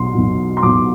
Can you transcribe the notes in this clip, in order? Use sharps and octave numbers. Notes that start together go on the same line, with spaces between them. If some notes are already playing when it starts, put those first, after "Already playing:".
Already playing: B1 B2 C6
B1 B2
C6
B1 B2 D6